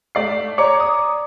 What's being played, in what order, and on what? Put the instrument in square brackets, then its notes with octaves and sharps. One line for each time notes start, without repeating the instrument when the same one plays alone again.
[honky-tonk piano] A3 D5 C7
[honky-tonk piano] C#5 C#7 [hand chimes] D5 A#5 D6
[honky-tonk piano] D#6